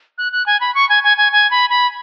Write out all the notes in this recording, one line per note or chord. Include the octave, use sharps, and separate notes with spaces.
F#6
F#6
G#5
B5
C#6
G#5
G#5
G#5
G#5
B5
B5